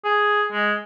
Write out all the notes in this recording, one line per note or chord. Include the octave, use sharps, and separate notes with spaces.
G#4
G#3